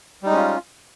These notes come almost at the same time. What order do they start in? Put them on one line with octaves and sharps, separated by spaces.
G3 D#4 G#3 C#4 F4